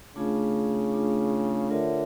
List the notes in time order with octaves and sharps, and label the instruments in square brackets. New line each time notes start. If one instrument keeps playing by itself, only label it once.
[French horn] C#3 [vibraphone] A3 D4 F4 G#4
[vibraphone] A3 D4 F4 G#4
[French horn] D3 [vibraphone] F4 A#4 C#5 E5